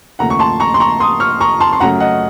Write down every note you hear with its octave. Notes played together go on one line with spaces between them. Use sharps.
D#2 C#3 F3 A3 F#5 A#5
C#6
A5 C6
A#5 C#6
C6
A#5 C#6
C6 D#6
C#6 F6
A#5 C#6
A5 C6
C6
F#2 C#3 F#3 A3 F#5 A#5
D#5 F#5